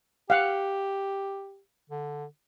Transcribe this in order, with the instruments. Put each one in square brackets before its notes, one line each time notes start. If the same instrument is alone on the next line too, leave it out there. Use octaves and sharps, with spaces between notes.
[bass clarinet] G4 [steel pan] F5 F#5
[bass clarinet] D3